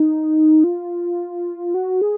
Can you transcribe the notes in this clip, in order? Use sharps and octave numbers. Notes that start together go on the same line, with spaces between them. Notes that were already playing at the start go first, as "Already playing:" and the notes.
Already playing: D#4
F4
F#4
G#4